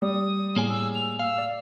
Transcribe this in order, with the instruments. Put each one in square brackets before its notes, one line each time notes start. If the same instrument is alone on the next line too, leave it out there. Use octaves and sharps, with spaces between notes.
[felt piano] G3 [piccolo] D#6
[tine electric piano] A2 C#5 [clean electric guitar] A#3 G#4 G#5
[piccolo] E6
F7
[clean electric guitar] F5 [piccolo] E6
[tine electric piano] D5